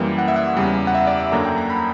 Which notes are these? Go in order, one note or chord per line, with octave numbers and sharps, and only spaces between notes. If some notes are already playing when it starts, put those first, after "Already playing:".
Already playing: F#2 E3 G3 A#3 G5
F#5
E5
F#5
E2 C#3 G3
F#5
E5
D5
E5
F#2 D3 F#3 A#3 A#5
G5
A#5
B5